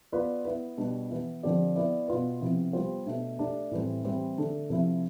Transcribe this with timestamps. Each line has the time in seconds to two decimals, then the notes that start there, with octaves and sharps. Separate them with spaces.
0.12 B3 F4 B4 D5
0.45 B3 E4 B4
0.77 B2 G3 D4
1.10 E3 B3 E4
1.43 D3 F3 C4 G4 D5
1.76 B3 E4 B4 D5
2.08 B2 B3 F4 B4
2.41 C3 F3 B3 E4
2.73 G3 B3 F4 C5
3.06 B2 A3 D4
3.39 A3 D4 G4 D5
3.71 A2 E3 G3 C4
4.04 E3 G3 C4 E4
4.37 D3 A3 D4 A4
4.70 C3 F3 A3 E4